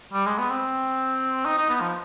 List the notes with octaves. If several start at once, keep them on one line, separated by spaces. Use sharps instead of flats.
G3
G#3
B3
C4
D#4
D#4
B3
F3